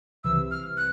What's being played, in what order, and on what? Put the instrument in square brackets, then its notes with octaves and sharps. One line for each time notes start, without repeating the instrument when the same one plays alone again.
[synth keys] C2 C3 E3 [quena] E6
[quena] F6
F#6